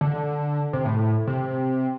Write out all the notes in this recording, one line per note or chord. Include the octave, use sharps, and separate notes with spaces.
D3
C3
A2
C3